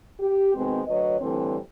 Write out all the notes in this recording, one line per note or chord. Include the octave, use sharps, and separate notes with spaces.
G4
B2 D#3 G#3 C4
D2 F#3 B4 C#5 D#5
A2 D3 E3 G3 C4